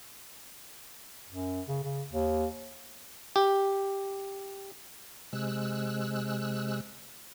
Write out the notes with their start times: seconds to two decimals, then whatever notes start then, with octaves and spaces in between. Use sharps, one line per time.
1.30 F#2
1.68 C#3
1.84 C#3
2.12 D#2
3.36 G4
5.33 C3 G#3 E6 F#6